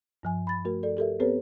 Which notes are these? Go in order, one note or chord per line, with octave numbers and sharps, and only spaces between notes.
G2 F3 G#5
B5 A6
A3 F#4 A#4
A4 D5
G4 A4 A#4 E5
B3 C4 G4 A4 B4 C#5